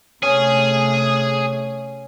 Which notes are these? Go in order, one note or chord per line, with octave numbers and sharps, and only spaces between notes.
C3 A3 C#4 G#4